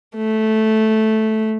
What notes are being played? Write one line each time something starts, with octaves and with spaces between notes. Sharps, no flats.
A3